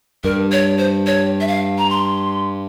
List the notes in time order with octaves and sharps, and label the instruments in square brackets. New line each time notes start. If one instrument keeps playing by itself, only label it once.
[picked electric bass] G2 [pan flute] A#4
[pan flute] C#5
C5
C#5
E5
F5
A#5
C6